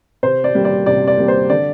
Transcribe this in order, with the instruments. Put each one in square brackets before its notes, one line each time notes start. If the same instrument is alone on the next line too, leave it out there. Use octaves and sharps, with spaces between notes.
[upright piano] C3 C5
D5
G3 A#3
D5
C3 D5
D5
G3 A#3
C5
D3 D5